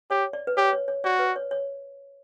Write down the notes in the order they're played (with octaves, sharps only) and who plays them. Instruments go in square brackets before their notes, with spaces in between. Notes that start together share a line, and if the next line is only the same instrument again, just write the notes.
[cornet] G4 [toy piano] C#5
[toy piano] D5
B4
[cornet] G4 [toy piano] C#5
[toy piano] C#5
C#5
[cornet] F#4 [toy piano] D5
[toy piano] B4
C#5
C#5